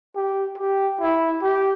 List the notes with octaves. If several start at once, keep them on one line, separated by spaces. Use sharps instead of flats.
G4
G4
E4
G4